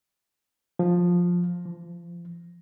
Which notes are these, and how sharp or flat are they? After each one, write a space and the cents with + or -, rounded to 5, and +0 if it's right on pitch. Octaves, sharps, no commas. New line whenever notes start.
F3 +10
F3 -30